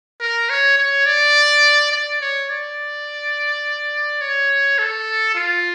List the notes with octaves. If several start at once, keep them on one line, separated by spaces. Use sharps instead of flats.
A#4
C#5
C#5
D5
D5
C#5
D5
C#5
A4
F4